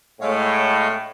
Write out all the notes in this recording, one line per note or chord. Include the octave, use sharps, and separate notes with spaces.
A2 G#3 C#5 F5